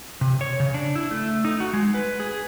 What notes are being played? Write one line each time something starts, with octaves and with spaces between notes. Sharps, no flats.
C3
C#5
C#3
D4
E4
A3
D#4
F#4
G#3
B4
G#4